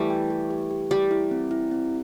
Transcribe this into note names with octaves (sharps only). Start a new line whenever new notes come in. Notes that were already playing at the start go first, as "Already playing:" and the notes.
Already playing: E3 G3 A3
G5
G4
G4
G4
G3 E4
E4
C4
E4
C4